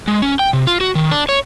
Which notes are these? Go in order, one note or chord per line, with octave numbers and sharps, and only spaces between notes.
G#3
C#4
G5
C3
F4
F#4
D#3
D4
C#5